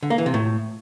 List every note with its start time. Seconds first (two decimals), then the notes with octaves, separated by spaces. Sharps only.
0.03 D3
0.10 A#3
0.18 E3
0.26 C3
0.34 A2